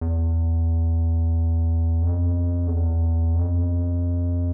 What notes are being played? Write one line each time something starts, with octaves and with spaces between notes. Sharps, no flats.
E2
F2
E2
F2